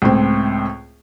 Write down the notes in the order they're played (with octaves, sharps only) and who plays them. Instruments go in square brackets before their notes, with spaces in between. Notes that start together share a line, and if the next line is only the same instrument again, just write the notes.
[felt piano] C#2 A2 C4